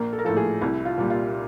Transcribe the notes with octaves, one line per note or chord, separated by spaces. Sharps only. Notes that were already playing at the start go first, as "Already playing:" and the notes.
Already playing: A#1 A#4
A4
A#4
A2 F3 A4
G#4
C2 E4
F4
A#2 G3
F4